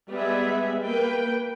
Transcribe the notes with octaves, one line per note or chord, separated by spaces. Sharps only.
G3 G#3 B3 G#4 B4 E5
A#3 B4 G5